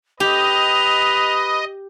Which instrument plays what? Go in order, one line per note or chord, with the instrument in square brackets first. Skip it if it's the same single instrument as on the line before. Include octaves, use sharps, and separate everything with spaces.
[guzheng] G4 [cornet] B4 [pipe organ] D#5 [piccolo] F7